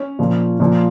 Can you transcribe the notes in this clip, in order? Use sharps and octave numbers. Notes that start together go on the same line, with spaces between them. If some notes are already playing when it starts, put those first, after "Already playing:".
Already playing: C#4
A#2 F3
A#2 F3